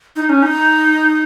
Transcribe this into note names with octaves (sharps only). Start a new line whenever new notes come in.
D#4
C#4
D#4